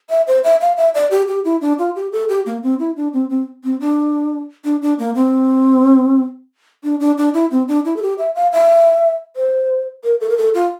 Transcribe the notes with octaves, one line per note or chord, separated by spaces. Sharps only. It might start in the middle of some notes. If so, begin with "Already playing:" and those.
E5
C5
E5
F5
E5
D5
G4
G4
E4
D4
F4
G4
A4
G4
A#3
C4
E4
D4
C4
C4
C4
D4
D4
D4
A#3
C4
D4
D4
D4
E4
C4
D4
E4
A4
G4
E5
F5
E5
C5
A#4
A4
A#4
A4
F4